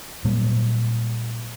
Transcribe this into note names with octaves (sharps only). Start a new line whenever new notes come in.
A#2 F#3 G3 A#3